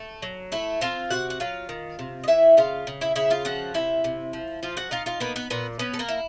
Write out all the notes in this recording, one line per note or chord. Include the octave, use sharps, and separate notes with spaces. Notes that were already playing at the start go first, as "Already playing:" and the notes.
Already playing: A3
F#3
A3 E4 E5
C4 F4 F5
C3 F#4 F#5
F#5
F#3 F4 F5
D#3
C3
D#5
E3 E4 E5
C#3 F4 F5
C#3
E4 E5
C#3 E4 E5
F4 F5
F3 F#4 F#5
C3 E4 E5
C3
F3
F3 F4 F5
F#4 F#5
D#4 F4 F5
F4 F5
A#3 B3 B4
B3 B4
A#2 B3 B4
B3 C#4 B4
A4
A#3 A#4
E4